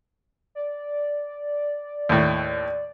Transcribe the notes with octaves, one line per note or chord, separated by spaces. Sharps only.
D5
D#2 A2